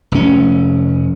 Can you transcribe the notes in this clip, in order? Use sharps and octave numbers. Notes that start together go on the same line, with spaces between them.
F1 C#4